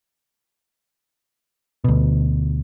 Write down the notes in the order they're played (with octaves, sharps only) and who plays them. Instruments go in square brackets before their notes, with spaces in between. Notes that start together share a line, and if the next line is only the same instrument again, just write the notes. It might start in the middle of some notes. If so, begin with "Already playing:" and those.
[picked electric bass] D2 B2